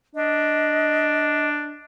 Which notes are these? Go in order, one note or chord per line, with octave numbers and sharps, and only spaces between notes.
D4 D#5